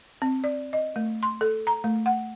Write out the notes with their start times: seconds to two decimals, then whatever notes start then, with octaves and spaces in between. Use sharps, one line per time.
0.22 C4
0.44 D5
0.73 D#5
0.96 A3
1.23 C6
1.41 A4
1.67 A#5
1.84 A3
2.06 F#5